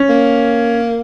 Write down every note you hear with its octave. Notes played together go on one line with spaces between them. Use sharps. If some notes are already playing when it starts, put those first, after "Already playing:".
Already playing: C#4
A#3